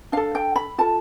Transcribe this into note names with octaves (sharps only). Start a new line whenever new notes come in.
D4 A4 F5
G5
B5
F4 A4 A5